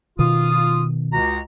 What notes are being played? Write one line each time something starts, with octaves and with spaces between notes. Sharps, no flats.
B2 D#3 F4 D#6
C#2 F#4 A#5